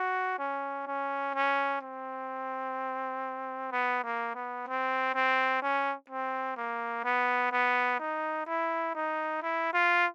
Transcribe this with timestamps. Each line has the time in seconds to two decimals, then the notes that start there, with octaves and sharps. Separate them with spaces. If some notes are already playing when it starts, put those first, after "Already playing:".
Already playing: F#4
0.39 C#4
0.87 C#4
1.35 C#4
1.81 C4
3.72 B3
4.04 A#3
4.35 B3
4.68 C4
5.15 C4
5.62 C#4
6.10 C4
6.57 A#3
7.04 B3
7.53 B3
8.00 D#4
8.47 E4
8.95 D#4
9.42 E4
9.74 F4